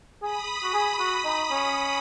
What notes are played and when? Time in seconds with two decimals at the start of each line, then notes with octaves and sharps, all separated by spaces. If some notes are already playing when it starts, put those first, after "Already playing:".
0.22 G#4 B5 D#6
0.63 F#4
0.74 G#4
1.00 F#4
1.25 D#4
1.51 C#4